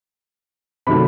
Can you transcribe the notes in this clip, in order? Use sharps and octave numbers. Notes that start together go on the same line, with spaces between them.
C3 D#3 F#3 A3 B5